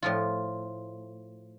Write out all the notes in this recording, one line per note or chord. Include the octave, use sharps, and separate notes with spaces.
A2 F3 F4